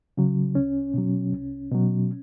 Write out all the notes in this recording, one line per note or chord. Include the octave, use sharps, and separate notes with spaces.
C#3 F#3
C2 C#4
B2 F#3
C2
B2 F#3